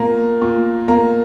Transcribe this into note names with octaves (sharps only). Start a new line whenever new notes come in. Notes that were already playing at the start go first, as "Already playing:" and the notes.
Already playing: A#2 A#3 A#5
A#2
A#3 A#5